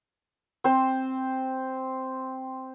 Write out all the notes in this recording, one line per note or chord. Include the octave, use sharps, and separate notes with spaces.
C4 C5